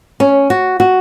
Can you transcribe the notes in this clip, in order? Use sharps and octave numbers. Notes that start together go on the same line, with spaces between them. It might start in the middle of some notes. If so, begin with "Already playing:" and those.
C#4
F#4
F#4